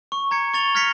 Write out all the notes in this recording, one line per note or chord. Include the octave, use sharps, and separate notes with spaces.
C#6
A#5 G#6 C#7
C#6 A6 F7 G7
F6 G#6 A#6 B6 C#7 F7